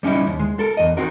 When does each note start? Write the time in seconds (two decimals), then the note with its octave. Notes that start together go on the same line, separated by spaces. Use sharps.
0.03 G3 C#4 D#4 E4
0.27 D#2
0.39 G#3
0.59 A4 A#4
0.77 E2 D#5
0.97 C4 D#4 F#4 A#4